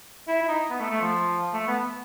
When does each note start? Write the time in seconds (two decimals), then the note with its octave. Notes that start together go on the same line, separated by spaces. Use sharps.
0.28 E4
0.43 E4
0.48 D#4
0.70 B3
0.80 A3
0.91 A3
1.01 F3
1.53 A3
1.67 B3